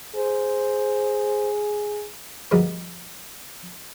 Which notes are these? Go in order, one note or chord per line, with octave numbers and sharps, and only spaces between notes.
G#4 C5
D2 G2 F3 G#3 A#3 B3